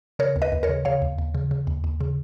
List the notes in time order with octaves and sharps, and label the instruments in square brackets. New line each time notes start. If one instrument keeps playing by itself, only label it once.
[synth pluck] C#3 A#4 C#5
D#2
B4 D#5
D#2
A#4 C#5
C#3
C#3 C#5 F5
D#2
D#2
C#3
C#3
D#2
D#2
C#3